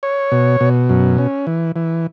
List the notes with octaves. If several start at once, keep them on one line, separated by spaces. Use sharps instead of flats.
C#5
B2
B2
F#2
C#4
E3
E3